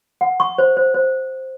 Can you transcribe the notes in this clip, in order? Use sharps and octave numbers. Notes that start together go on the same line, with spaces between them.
F#5
C#6
C5
C5
C5